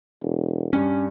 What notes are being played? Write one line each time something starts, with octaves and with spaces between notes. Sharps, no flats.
E1
G2 C#4 G4